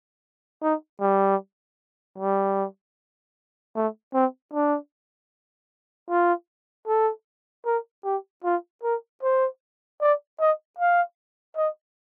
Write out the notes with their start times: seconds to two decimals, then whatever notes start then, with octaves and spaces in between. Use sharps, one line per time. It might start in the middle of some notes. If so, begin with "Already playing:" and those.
0.62 D#4
1.01 G3
2.18 G3
3.76 A3
4.14 C4
4.53 D4
6.10 F4
6.87 A4
7.66 A#4
8.05 G4
8.44 F4
8.83 A#4
9.23 C5
10.01 D5
10.40 D#5
10.79 F5
11.57 D#5